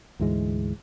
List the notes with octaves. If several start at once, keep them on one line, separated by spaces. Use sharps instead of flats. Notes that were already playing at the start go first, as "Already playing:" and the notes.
D2 G#2 E3 G#3